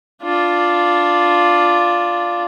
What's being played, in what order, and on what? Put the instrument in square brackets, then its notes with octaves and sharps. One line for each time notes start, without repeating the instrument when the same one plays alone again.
[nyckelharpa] D4 F4